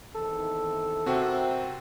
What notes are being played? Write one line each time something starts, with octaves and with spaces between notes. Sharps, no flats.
E2 C3 D#3 A4
C3 C4 F#4 A#4 E5 G5